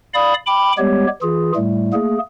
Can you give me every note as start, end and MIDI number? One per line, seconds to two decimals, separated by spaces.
0.14 0.34 74
0.14 0.34 77
0.14 0.34 83
0.14 0.34 87
0.46 0.72 79
0.46 0.72 83
0.46 0.72 86
0.78 1.07 55
0.78 1.07 56
0.78 1.07 59
0.78 1.07 67
0.78 1.07 73
1.22 1.52 52
1.22 1.52 65
1.22 1.52 68
1.55 1.92 45
1.55 1.92 55
1.55 1.92 57
1.93 2.18 57
1.93 2.18 58
1.93 2.18 68